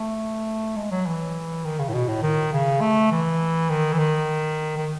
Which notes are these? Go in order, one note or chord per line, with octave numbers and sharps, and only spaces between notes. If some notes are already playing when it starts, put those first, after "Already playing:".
Already playing: A3
G#3
F#3
E3
D#3
C#3
A2
B2
A2
D#3
C#3
A3
E3
D#3
E3
D#3
D#3